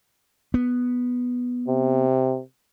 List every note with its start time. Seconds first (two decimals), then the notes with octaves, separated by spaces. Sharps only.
0.54 B3
1.68 C3